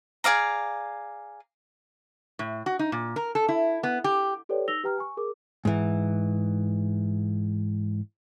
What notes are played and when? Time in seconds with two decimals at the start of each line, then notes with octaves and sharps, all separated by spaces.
0.24 G#4 D5 F5 A#5
2.39 A2
2.66 F#4
2.79 D#4
2.92 A#2
3.16 A#4
3.35 A4
3.49 E4
3.83 B3
4.04 G4
4.49 G4 A4 B4 C#5 D5 G5
4.68 D#4 E6 A#6 F7 G7
4.84 G4 B4 G5 A#5 F6
4.98 G#5 C#6
5.17 G#4 A#4 D6
5.65 G#2 E3